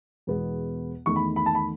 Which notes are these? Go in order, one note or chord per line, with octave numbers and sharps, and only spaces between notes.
E2 B2 G#3 B3
E2 D#3 A3 C#6
B5
B5
A5
B5